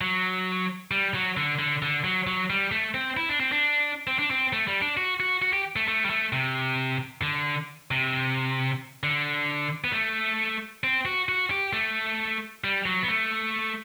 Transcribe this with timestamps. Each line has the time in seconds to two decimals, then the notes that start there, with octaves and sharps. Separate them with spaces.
0.01 F#3
0.91 G3
1.14 F#3
1.37 D3
1.59 D3
1.82 D3
2.04 F#3
2.27 F#3
2.50 G3
2.72 A3
2.94 C4
3.17 E4
3.29 D4
3.40 C4
3.52 D4
4.07 C4
4.19 D4
4.30 C4
4.53 A3
4.67 G3
4.82 D4
4.97 F#4
5.20 F#4
5.42 F#4
5.53 G4
5.76 A3
5.88 A3
6.05 G3
6.10 A3
6.33 C3
7.22 D3
7.91 C3
9.03 D3
9.84 B3
9.92 A3
10.84 C4
11.05 F#4
11.29 F#4
11.51 G4
11.73 A3
12.64 G3
12.86 F#3
13.02 B3
13.08 A3